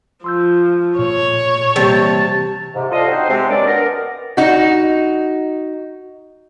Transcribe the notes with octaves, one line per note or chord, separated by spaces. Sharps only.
F3 C6 E6 G6
A#2 C#5
C3 E3 G3 A#3 A5
G#2 C3
D4 F4 A4 C5 D#5
C4 D#4 F#4 C5
C3 G#3 C4
F#2 A#3 C#4 D4 D5
B3 A#4
D#4 F#4